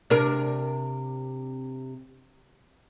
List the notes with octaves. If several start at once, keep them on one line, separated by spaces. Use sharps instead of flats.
C3 D4 A#4